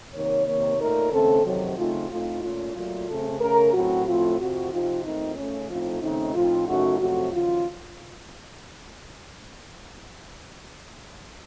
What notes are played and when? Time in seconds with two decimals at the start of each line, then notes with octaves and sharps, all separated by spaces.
0.13 C3 D#3 A#3 D#4 C#5
0.46 C3 D#3 A#3 C#5
0.78 A#2 A3 D#4 A#4
1.11 D#2 C#3 A3 C4 A4
1.44 F2 C3 D#3 F#3
1.77 C#3 A3 C4 D#4 F4
2.09 A2 A3 C4 D#4 F4
2.42 A#2 A3 C#4 F4
2.75 A#2 F#3 A3 F4
3.07 C#3 A3 C4 A4
3.40 C#3 A3 C#4 A#4
3.73 A2 F#3 C4 F#4
4.05 A2 F3 A3 C4 F4
4.39 F2 C3 F3 C4 F#4
4.70 C3 F3 C4 D#4 F4
5.04 D#2 D#3 A3 C4 D#4
5.36 C#3 A3 C#4
5.69 A2 F3 A3 C4 D#4 F4
6.01 D#2 C#3 A3 C4 D#4
6.35 A2 F3 C4 D#4 F4
6.67 F#2 C#3 A3 D#4 F#4
6.99 F2 C3 F#3 A3 F#4
7.32 D#2 C#3 F3 F4